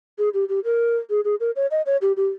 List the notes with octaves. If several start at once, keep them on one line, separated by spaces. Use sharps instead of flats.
G#4
G4
G4
A#4
G#4
G#4
A#4
C#5
D#5
C#5
G4
G4